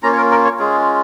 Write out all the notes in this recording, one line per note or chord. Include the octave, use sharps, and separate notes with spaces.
A#3 C#4 F4 A#5
C#5
A#4
A#4
C#5
G#3 C#4 F4 G#4